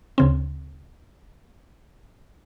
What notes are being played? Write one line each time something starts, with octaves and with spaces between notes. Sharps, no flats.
D2 C#3 C4